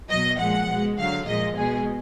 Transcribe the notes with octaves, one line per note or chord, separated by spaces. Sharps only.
B2 F#3 D#5
A#2 F3 G#3 F#5
B2 G#3
D3 F#3 F5
A#2 F3 G#3 D#5
B2 G#3 G#4